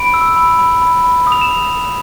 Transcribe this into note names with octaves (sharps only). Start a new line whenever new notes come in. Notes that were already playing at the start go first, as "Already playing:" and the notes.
Already playing: B5 D7
E6
B5
B5
B5
B5
D#6
F7
E7